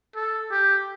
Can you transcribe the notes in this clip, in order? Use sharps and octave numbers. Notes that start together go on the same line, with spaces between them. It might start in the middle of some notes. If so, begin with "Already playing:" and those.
A4
G4